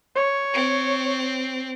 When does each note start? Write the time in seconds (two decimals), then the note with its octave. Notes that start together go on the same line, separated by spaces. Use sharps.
0.16 C#5
0.54 C4